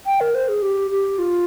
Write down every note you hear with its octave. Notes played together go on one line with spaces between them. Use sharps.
G5
A#4
C5
G#4
G4
G4
F4